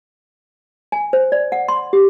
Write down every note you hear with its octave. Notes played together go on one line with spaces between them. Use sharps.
G#5
C5
D5
F#5
C6
G4